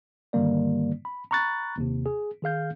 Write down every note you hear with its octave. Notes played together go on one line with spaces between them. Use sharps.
G2 D3 D#3 G3 A#3 D5
B5
A#5 B5 C#6 F#6 A6
D#2 C3
G#4
D#3 G#4 F5 G6